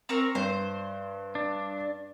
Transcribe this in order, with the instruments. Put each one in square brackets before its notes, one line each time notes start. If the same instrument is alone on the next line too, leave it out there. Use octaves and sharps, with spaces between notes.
[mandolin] C4 A#4 C#6
[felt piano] G2 [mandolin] C5
[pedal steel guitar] D4